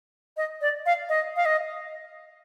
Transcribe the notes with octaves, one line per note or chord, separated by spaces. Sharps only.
D#5
D5
F5
D#5
F5
D#5